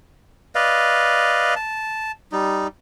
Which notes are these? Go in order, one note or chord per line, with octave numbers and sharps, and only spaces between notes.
B4 D5 D#5 F5
A5
G3 D#4